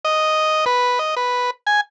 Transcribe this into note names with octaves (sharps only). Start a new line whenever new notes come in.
D#5
B4
D#5
B4
G#5